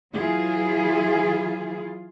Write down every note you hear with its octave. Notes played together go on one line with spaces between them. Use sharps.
E3 F#3 E4 F4 G#4